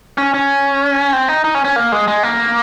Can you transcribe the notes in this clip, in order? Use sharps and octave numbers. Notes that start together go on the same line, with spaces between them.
C#4
C#4
C4
D#4
D#4
C#4
C#4
A#3
G#3
G#3
A#3